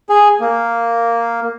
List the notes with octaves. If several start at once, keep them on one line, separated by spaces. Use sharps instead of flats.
G#4
A#3